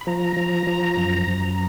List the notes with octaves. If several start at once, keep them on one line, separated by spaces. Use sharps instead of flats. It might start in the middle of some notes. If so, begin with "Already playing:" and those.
B5
F3 A#5
F3
F3
F#2
F#2